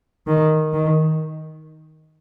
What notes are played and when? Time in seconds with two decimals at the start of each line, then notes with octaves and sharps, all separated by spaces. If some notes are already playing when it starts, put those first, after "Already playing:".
0.27 D#3
0.73 D#3